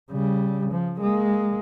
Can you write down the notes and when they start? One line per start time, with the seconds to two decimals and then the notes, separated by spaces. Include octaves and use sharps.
0.11 C#3 G3
0.72 F3
1.01 G#3 A#3